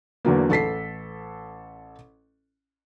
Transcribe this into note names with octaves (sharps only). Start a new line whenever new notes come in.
E2 D3 F#3 A#3
A1 A4 B6 C7